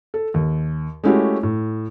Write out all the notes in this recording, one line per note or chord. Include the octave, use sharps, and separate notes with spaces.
A4
D#2
G#3 A3 C#4 E4 F#4 G4
A2